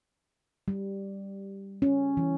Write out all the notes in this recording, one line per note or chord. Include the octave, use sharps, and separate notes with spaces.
G3
C#4
E3